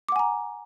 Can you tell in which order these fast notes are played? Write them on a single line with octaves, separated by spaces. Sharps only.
D6 F#5 G#5 A#5